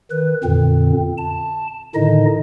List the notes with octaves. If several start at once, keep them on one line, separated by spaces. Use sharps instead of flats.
D#3 B4
F2 A#2 D3 C4
A5
A2 D3 D#3 D#4 D#5